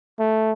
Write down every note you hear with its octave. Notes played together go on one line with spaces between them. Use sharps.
A3